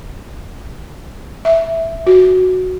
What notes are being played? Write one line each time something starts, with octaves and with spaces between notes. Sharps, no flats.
E5
F#4